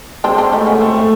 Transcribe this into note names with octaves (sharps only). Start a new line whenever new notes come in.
G#3 C4 D4
C4 D4
A3 C#4 D#4
B3 C#4
A3 C4